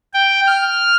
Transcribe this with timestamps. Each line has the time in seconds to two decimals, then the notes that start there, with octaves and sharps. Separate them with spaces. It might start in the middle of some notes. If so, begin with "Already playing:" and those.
0.14 G5
0.47 F6